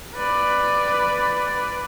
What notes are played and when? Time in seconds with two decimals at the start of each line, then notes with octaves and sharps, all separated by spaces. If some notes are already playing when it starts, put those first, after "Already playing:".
0.15 B4 D5